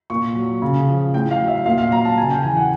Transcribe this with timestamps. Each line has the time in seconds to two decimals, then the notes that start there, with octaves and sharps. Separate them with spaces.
0.10 A#2 C#6
0.36 F#3
0.62 C#3
0.87 F3
1.14 A2 G5
1.31 F5
1.40 F#3
1.48 E5
1.65 A#2 F5
1.78 F5
1.92 F#3 A#5
2.05 A5
2.18 C#3 G#5
2.31 G5
2.43 E3 G#5
2.57 F#5